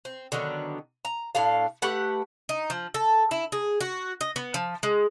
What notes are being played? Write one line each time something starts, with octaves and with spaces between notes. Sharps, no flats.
C4
D3 D#3 F#3 B3
A#5
A2 D4 A4 F5
A3 G4 B4 F#5
D#4
F3
A4
E4
G#4
F#4
D#5
B3
F3
G#3